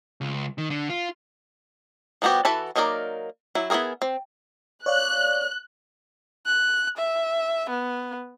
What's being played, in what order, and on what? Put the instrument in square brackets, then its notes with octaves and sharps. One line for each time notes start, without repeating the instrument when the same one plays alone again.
[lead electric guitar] C#2
D#3
D3
F4
[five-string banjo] F3 G3 B3 F#4 G4
E3 F#4 A4 A5 B5
F#3 A#3 D#4 A#4 D5
F#3 E4
B3 E4 F#4 G#4 A#4
C4
[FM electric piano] C#5 D5 F5 [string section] F#6
[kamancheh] F#6
E5
B3